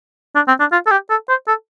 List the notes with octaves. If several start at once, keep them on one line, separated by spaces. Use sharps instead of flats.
D4
C4
D4
F4
A4
G4
A4
C5
A4